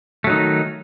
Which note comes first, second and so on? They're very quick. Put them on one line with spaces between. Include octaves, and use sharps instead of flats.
A3 F#3 D#4 D#3